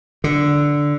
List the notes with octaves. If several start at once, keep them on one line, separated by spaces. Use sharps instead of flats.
D3